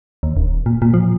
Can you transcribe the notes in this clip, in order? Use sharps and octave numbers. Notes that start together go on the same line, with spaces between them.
D#2
D#1
A#2
A#2
F3